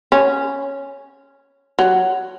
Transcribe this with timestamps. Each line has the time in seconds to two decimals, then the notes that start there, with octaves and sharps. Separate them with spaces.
0.12 C#4
1.79 F#3